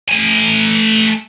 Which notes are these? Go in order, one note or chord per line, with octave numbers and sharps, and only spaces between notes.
A3 G#5